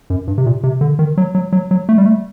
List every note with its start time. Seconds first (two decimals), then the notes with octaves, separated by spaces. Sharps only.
0.10 F#2
0.27 G2
0.38 C3
0.46 A#2
0.63 C3
0.81 D3
0.99 D#3
1.17 F#3
1.35 F#3
1.53 F#3
1.71 F#3
1.89 A3
1.98 G3
2.06 A3